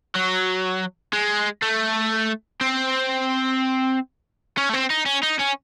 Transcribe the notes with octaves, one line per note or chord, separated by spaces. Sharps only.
F#3
G#3
A3
C4
C#4
A3
C4
D#4
C#4
D#4
C#4